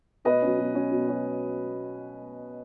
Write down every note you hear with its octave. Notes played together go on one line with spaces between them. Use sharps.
B2 B4 D#5
F#3 C#4
B2
F#3 C#4
B2
F#3 C#4